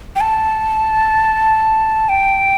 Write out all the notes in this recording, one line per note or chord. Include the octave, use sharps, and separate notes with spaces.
G5
A5
G5